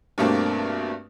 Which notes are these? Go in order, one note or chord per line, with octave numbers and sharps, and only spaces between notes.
G2 B2 A3 A#3 C4 D4